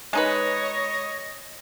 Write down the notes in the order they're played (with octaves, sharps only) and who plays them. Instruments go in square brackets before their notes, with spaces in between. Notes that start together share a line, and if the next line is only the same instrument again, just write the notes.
[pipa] G#3 D#4 B4 [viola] C#5 [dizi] D#5